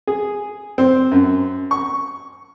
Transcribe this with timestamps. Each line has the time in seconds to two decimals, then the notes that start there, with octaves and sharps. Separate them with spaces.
0.07 G#4
0.78 C4
1.11 F#2
1.71 C#6